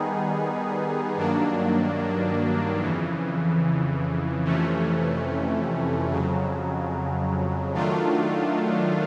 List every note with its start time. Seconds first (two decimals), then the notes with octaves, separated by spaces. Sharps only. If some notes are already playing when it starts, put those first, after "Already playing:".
Already playing: D#3 G3 B3 D#4 G#4
1.16 G2 D#3 F#3 A#3 D4
2.80 F2 C#3 E3
4.45 F2 C3 E3 A3 C#4
6.10 F2 C#3 F#3
7.74 D#3 F#3 A3 D4 F4